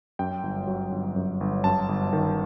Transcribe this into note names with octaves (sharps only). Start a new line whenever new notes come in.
F#2 G5
G1
F#3
G1
F#2
G1
F#2 A5
G1
D#3